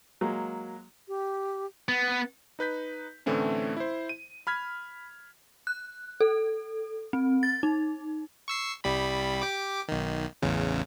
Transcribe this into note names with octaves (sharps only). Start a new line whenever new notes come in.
F#3 G#3 A#3
G4
B3
D#4 B4 G6 B6
A2 D3 E3 A3 C4 C#4
E4 C5
D#7
B5 F6 G#6 B6
F#6
A4
C4
A6
D#4
C#6 E6 C7
C2 G3 B5
G4 D6
B1 D#3
A1 E2 C#3